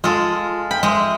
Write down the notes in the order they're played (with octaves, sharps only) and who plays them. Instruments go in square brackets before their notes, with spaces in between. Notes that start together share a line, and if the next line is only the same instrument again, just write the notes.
[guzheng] G#3 A4 [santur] F4
[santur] G5 [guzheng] B5
[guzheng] G#3 [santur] C5 E5